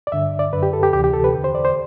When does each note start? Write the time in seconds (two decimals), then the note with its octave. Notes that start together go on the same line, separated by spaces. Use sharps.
0.07 D5
0.12 G2 D3 E5
0.39 D5
0.53 F#2 D3 B4
0.63 G4
0.73 A4
0.83 G4
0.93 D2 C3 E3 G4
1.04 G4
1.14 A4
1.24 B4
1.34 E2 D3
1.44 C5
1.55 D5
1.65 C5